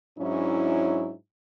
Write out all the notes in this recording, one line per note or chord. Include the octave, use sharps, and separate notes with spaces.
G#2 F#3 C#4 D4 E4